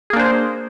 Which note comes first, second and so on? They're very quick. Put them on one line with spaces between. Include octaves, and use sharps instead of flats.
G#4 A#3 D4 C5